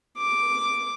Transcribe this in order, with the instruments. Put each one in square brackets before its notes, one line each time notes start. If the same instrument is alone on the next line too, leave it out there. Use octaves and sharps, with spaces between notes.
[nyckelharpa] D6